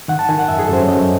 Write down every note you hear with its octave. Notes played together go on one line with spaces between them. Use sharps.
D#3 F#5
A5
D#3 G#5
F#5
F#2 E5
G#4
A4
F#2 C5
C#5
F#2 D#5